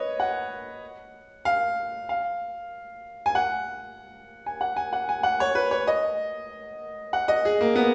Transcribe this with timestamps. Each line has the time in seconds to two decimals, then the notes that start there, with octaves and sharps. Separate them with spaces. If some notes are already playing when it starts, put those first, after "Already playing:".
Already playing: B4 C#5 D#5
0.20 F#5
1.45 F5
2.09 F5
3.26 G#5
3.35 F#5
4.46 G#5
4.61 F#5
4.76 G#5
4.93 F#5
5.09 G#5
5.23 F#5
5.40 C#5
5.55 B4
5.71 C#5
5.87 D#5
7.13 F#5
7.28 D#5
7.45 G#4
7.61 A#3
7.76 B3